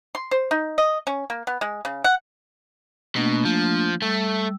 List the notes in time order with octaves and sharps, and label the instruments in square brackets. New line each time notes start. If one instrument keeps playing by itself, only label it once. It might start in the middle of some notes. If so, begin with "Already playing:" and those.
[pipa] C6
C5
D#4
D#5
C#4
A#3
B3
G#3
C#3
F#5
[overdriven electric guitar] B2 [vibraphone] A3 A#3 D4
[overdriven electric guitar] F3
[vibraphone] G3 E6 [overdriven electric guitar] A3